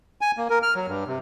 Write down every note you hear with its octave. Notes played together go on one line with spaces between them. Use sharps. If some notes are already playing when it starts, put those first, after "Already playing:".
G#5
A#3
A#4
F6
F#3
G2
C3